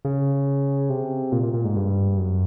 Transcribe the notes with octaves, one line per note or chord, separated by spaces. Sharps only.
C#3
C3
A#2
A#2
A#2
G#2
G2
F#2